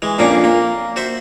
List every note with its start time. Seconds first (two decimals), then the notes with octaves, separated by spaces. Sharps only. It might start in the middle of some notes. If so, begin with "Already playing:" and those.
0.02 E3 G#3
0.18 F2 A#2 A#3 C#4 D4
0.44 A#3
0.96 F#4 C5 E5